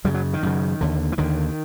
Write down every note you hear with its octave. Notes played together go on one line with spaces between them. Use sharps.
F#2 C#3 G3
F#3
D#3
F#2 C#3
D#2 D3
E3
D#2 D3 D#3